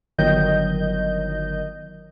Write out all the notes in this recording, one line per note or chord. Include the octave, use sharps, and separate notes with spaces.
G1 D#3 F#3 D#5 G6